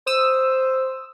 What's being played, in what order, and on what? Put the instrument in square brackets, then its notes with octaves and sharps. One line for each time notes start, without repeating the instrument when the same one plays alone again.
[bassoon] C5 [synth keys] D#6 E6